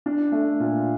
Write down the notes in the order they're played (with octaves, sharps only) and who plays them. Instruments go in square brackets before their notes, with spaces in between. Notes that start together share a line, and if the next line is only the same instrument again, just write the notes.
[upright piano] D4
A3
A#2